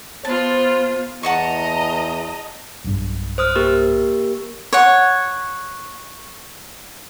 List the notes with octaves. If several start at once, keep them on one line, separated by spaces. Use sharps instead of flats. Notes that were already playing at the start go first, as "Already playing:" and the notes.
B3 F4 C5 A5
E2 D#5 F#5 A5 A#5 C#6
B1 G2
C5 D#6 F6
A#3 G4 A#4
C#5 F#5